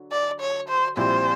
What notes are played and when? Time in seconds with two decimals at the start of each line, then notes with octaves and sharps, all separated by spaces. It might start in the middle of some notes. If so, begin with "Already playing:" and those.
Already playing: D3 F#3
0.12 D5
0.41 C#5
0.69 C5
0.97 A#1 A#2 G3 C4 E4 C5